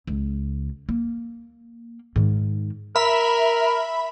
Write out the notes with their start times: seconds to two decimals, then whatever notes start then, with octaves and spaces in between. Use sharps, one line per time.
0.07 C#2
0.89 A#3
2.16 G#2 D#3
2.96 A#4 E5 B5